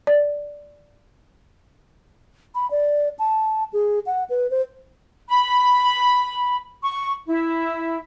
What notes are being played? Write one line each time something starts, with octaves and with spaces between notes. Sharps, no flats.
D5
B5
D5
A5
G#4
F#5
B4
C5
B5
C#6
E4